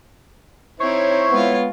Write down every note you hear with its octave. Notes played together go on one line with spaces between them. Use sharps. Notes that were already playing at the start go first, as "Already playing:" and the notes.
C4 D#4 E4 C5 C#5
G#3 B3 F4